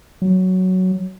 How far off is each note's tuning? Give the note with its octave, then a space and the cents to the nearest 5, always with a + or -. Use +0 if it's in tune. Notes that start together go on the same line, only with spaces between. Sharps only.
F#3 +5